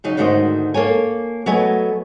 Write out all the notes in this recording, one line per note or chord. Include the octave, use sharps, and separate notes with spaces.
C#3 F#3 D#4
D2 G#2 D#3 F#4 C5 D#5
A#3 A4 C#5 G#5
F#3 A3 B3 D#5 G#5